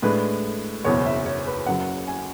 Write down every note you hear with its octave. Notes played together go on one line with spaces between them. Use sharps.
A2 G#3 D4 B4
F#1 E2 B2 C#5
E5
C#5
B4
F#1 F#2 C#3 F#3 F#5
G#5